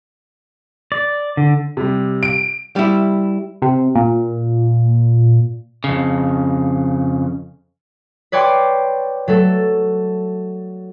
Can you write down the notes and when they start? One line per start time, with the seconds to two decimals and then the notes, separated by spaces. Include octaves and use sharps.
0.92 D5
1.37 D3
1.77 C3 G3
2.23 D7
2.76 G3 E4
3.62 C3
3.95 A#2
5.84 F2 C#3
8.32 B4 C#5 D5 G5 C6 D6
9.28 F#3 A3 A4